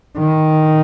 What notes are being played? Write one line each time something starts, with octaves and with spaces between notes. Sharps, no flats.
D#3